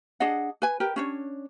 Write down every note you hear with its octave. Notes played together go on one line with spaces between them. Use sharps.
D4 G#4 D#5 F#5
B4 G#5
G4 A#4 B4
C#4 D4 C#5